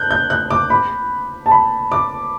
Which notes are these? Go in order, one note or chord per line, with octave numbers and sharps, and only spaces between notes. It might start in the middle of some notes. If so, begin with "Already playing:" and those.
Already playing: F#6 G6
G6
F#6
D6
B5
A5
B5
D6